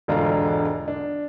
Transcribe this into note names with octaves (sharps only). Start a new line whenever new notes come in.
E1 G#2 D3 D4 F4 A#5
D4